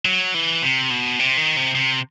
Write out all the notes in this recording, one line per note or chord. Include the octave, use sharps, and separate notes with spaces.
F#3
E3
C3
B2
C3
D#3
C3
C3